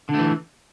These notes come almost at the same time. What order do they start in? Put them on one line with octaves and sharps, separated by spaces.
D3 A3 E3